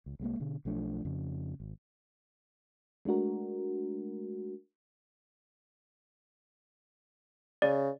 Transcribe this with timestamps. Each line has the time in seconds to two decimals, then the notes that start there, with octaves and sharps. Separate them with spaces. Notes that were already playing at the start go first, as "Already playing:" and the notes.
0.06 C#2
0.20 C2 G#3 A#3
0.40 B2 D3
0.65 B1 F3 A3 D4
1.05 F2 C#3
1.60 G#1
3.05 G#3 A3 D4 F#4 A#4
7.62 C#3 D5